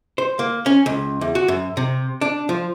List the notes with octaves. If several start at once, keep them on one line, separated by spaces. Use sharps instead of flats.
C5
A#3
C#4
C#2
E2
F#4
F#2
C3
D4
F3